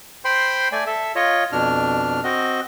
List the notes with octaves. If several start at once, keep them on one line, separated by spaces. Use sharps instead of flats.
C5 G5 B5 C6
A3 D5 G#5
A4 E5
F4 C#5 D#5
F2 B2 D4 F6
C4 F#4 D#5